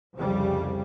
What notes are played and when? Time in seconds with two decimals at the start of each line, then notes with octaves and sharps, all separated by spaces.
0.16 C2 F2 C#3 G3